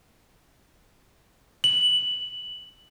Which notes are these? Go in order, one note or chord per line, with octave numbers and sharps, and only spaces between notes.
F#7